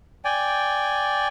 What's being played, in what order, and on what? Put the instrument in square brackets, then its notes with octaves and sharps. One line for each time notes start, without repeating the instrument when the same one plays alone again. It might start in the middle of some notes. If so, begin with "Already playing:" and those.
[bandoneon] D5 G5 G#5